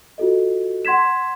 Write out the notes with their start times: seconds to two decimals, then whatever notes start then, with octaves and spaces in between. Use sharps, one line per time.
0.18 F4 F#4 A4 D#5
0.85 F#5 C6 G#6 B6 E7